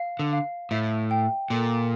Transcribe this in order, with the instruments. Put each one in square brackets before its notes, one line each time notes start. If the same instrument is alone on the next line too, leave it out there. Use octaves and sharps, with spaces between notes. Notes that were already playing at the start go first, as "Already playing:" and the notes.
Already playing: [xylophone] F5
[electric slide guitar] D3
[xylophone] F5
[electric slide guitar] A2 [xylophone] E5
[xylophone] G5
[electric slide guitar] A#2 [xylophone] A4